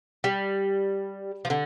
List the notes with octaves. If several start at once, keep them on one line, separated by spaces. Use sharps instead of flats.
G3
F3
D3